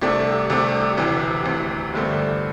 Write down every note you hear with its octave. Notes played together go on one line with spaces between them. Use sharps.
C2 C3 A3 D4 G4
C2 C3 A3 D4 G4
E1 D2 C3 E3
E1 D2 C3 E3
G1 G2 D3 A3 C4